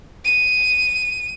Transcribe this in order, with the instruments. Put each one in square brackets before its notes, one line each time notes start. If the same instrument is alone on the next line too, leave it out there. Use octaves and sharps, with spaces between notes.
[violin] D#7